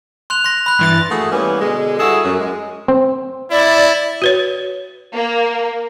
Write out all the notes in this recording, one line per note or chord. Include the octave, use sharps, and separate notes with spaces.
C6 F#6 F7
C6 A#6
B5 F#6
G2 E3 A6
A3 A#3 F#4 G#4
E3 G3 A#3 B3 C#4
B2 D3 G#3
G3 E4 F#4 G#4 A4
F#2
G#3
C4
E4 D5
F#4 B4 C#5
A#3